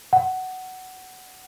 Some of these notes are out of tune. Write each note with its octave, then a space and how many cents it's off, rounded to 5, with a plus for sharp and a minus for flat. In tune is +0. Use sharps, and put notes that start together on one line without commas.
F#5 +10